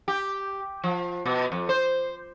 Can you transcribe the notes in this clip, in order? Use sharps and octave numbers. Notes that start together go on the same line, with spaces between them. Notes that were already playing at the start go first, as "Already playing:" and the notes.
G4
F3
B2
F2
C5